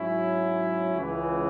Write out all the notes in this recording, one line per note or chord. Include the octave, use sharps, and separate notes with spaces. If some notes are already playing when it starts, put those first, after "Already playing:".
Already playing: G#2 F#3 C#4 E4
C#2 C#3 E3